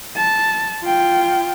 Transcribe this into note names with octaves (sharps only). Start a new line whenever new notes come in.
A5
F4 G5